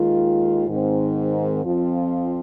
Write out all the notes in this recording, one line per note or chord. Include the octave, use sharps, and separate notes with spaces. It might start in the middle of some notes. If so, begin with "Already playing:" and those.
Already playing: D#2 D#3 G#3 F4
G#2 D#3 C4
F2 F3 C4 F4